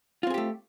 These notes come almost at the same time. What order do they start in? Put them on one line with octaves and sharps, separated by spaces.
F4 C4 G#4 G4 A3